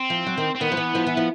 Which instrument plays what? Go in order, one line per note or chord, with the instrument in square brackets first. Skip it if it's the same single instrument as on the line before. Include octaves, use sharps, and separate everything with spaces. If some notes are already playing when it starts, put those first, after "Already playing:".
Already playing: [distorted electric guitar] C4
[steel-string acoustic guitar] F3
F#3
D#3
[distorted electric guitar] C4
[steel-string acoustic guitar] D#3 [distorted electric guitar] B3
[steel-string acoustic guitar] F3
E3
F3
E3
F3